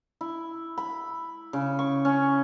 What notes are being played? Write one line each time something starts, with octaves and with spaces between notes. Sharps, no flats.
E4
B5
C#3
C#6
C#4